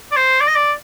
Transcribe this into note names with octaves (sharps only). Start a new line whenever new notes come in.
D5
C5
D5
D#5
D5